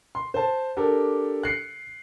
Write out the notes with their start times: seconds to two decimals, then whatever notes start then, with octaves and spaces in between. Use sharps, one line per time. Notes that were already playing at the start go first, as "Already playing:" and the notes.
0.15 C6
0.34 C5 A5
0.77 D4 G4 A4 A#4
1.43 F#6 C7 C#7